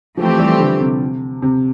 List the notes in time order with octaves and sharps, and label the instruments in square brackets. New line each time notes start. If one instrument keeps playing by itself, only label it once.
[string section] E3 A3 C4 G4 [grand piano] F3
[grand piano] G3
D3
C3
C3